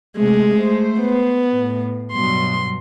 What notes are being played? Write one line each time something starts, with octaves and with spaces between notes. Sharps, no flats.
C3 G#3 A3
A3 C5
B3
A2
G2 B2 F#3 C6